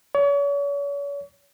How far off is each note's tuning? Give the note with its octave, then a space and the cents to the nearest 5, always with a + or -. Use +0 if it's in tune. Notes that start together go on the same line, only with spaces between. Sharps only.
C#5 +40